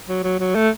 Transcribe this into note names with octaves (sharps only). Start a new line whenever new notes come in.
F#3
F#3
F#3
A3